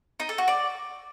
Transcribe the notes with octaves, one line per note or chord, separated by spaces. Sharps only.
D#4
A4
F#4
D5